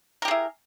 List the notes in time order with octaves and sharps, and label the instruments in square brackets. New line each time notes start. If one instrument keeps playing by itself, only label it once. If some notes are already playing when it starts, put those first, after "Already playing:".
[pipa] A#4
G4
G#4
E4